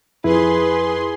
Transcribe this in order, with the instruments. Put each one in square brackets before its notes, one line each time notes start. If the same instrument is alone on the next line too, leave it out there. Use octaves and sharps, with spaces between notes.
[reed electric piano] F2 E4 [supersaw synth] G#4 C6 [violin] B4